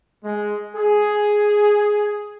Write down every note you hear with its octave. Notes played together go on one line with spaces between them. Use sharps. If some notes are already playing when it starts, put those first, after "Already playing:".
G#3
G#4